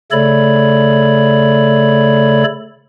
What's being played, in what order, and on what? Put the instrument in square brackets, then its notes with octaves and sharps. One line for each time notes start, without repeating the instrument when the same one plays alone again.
[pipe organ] C#3 A3 A4 C#5 D5 B5